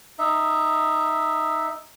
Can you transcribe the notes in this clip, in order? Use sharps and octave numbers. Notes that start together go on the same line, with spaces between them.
D#4 E5